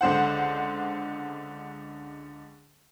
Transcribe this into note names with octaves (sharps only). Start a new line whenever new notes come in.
C#2 D3 C5 F#5